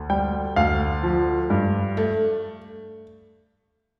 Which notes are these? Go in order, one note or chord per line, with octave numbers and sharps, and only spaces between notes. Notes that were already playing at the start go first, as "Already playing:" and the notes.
Already playing: D2
G3 G5
D2 F5
F3
G2
A3